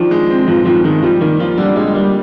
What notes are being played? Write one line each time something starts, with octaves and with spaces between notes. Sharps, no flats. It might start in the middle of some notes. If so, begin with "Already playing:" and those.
Already playing: D#3 F3 D4
G#3
C4
G2 F3
D#3 F3
D#3 G#3
F3 G3
D#3 A#3
F3 F4
D3 G3
G3 G#3
G3 A#3